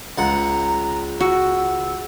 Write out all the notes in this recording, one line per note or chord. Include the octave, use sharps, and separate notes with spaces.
C#2 F#5 A#5
F#4 E6